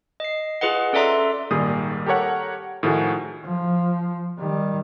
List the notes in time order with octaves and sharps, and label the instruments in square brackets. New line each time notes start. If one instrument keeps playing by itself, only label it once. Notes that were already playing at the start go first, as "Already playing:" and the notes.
[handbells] D#5 C7
F4 G#4 B4 D#5 F#5
C#4 A4 D5 E5 A#5 C6
[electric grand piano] G#1 A#2 D#3 G3 G#4 D#6
G4 A4 A#4 C#5 F#5
A2 D#3 F3 A3 F#4 G#4
[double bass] F3
D#3 G3